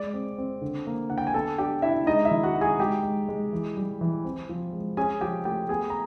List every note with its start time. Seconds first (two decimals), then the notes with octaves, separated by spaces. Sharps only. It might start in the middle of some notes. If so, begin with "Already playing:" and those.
Already playing: G#3 D5 D6
0.14 C4
0.38 C4
0.62 D3
0.87 A#3
1.10 D3 F#5
1.18 G5
1.27 G#5
1.34 B3 A4 A5
1.58 D4 G4 G5
1.82 D4 E4 E5
2.06 G#3 D#4 D#5
2.25 E4 E5
2.31 D#3
2.43 F#4 F#5
2.55 D#4
2.61 G#4 G#5
2.79 G#3 G4 G5
3.03 G#3
3.28 G#3
3.53 E3
3.77 G3
4.01 E3
4.24 C4
4.49 F3
4.73 G#3
4.97 C#4 G#4 G#5
5.21 F3 G4 G5
5.45 A3 G4 G5
5.69 B3 G#4 G#5
5.90 A#5